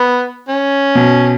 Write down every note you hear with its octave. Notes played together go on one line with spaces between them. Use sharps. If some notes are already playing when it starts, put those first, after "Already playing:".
Already playing: B3
C#4
B2